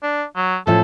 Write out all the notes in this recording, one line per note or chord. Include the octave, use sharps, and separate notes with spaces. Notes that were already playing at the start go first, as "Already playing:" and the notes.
D4
F#3
A2 F3 C#4 A4